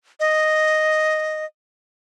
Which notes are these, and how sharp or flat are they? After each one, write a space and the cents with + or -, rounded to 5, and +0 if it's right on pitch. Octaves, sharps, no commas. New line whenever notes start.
D#5 -5